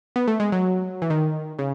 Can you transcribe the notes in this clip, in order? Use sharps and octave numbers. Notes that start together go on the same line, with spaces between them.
B3
A3
G#3
F#3
E3
D#3
C#3